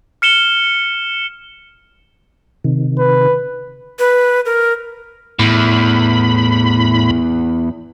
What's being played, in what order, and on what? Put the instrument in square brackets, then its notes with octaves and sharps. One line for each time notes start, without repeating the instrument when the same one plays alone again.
[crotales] F6 C#7 E7 G7
[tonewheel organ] C3 D#3
[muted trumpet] B4
[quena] B4
A#4
[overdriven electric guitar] E2 [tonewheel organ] A2 B5